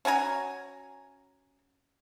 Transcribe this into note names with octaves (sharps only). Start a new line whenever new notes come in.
C#4 F#4 G#5 A#5